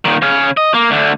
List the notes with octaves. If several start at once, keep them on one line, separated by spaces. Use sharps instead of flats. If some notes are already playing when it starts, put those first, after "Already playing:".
A#2 D#3
C#3 C#4
D#5
A#3
D2 D3